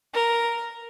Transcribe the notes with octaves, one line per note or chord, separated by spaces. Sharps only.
A#4